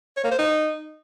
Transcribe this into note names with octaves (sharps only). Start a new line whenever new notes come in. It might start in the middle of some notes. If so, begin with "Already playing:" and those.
C#5
A#3
C5
D#4